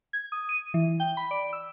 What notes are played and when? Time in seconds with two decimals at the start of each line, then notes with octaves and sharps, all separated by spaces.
0.13 G#6
0.32 D#6
0.49 D#7
0.74 E3
1.00 G5
1.17 B5
1.31 D5
1.53 E6